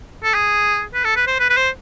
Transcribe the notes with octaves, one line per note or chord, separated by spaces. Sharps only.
A4
G#4
B4
A4
B4
C5
B4
B4
C5